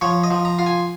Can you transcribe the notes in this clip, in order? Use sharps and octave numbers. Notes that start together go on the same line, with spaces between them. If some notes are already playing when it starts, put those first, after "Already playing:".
F3 C#5
D#5
F3
A#5
F4
G#5